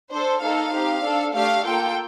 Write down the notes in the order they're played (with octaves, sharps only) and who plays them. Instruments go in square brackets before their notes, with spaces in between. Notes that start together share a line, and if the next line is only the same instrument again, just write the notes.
[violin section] D4 A4 C5
A#3 D#4 A4 F5
C4 D#4 G4
D4 A4
A3 D4 G4 F5
A#3 F4 A4 G5